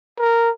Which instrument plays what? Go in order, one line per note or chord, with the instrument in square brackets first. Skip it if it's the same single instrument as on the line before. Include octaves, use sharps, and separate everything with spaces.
[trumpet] A#4